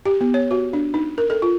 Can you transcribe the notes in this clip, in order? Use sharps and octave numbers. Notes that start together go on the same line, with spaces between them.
G4
B3
C#5
F#4
D4
D#4
A#4
A4
F4